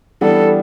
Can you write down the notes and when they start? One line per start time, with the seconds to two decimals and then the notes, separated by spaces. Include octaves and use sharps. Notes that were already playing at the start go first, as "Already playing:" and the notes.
0.21 E3 G3 B3 D4 A4